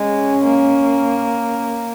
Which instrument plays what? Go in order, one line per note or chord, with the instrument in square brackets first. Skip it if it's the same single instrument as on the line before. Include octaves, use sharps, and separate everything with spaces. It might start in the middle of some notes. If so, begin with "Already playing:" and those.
Already playing: [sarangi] G#3 [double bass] C#4
[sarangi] A#3